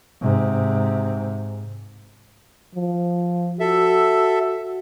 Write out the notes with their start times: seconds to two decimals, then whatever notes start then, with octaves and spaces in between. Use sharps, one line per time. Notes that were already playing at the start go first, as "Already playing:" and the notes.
0.21 G#2 C3
2.75 F3
3.60 F#4 A4 E5